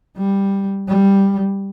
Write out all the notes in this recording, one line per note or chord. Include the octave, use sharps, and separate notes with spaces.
G3
G3